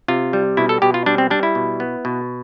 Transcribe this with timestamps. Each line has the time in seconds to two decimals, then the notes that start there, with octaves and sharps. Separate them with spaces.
0.08 C3 F4
0.33 G3
0.57 B2 E4
0.69 A4
0.82 B2 G4
0.94 F4
1.06 G3 D4
1.18 C4
1.30 G3 D4
1.43 E4
1.55 B2
1.80 B3
2.05 B2